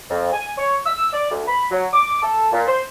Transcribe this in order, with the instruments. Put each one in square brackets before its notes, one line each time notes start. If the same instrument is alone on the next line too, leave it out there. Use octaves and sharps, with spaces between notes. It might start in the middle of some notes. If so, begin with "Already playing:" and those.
[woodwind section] F2
G#5
C#5
E6
D5
D2
B5
F#3
D6
A4
A#2
C5